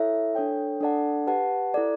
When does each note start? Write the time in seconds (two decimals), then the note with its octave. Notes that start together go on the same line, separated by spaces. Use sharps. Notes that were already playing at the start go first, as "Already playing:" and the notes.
Already playing: E4 A4 C#5 E5
0.35 D4 A4 C#5 G5
0.81 D4 A4 D5 F#5 A5
1.27 G4 B4 F#5 A5
1.74 E4 A4 D5